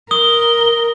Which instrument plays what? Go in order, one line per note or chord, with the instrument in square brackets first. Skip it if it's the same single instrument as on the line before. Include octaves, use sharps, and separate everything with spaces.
[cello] A#4 [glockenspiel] D#6 [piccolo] G7